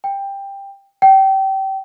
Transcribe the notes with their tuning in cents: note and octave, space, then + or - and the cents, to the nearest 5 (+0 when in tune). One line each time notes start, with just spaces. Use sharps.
G5 +15
G5 -25